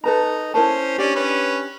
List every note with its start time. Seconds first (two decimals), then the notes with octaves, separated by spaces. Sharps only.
0.04 D#4 A4 B4 A#5
0.54 C#4 E4 A#4 C5 A5
0.98 C#4 D4 G4 D5
1.15 C#4 B4